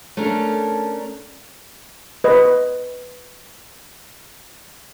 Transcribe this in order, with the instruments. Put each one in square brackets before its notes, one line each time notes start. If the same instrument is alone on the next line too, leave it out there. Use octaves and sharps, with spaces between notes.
[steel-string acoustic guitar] A3 C#4 D4 A#4
[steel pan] B4 D#5